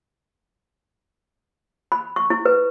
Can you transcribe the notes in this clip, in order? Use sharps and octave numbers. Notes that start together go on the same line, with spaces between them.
B5
C#6
E4
B4